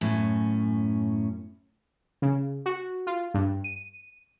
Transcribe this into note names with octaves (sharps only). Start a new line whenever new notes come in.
F#2 A2 C#4
C#3
F#4
F4
G2
D#7